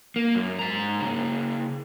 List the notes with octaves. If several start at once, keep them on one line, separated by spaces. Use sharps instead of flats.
A#3
F#2
G#2 A#5
C#3 A#3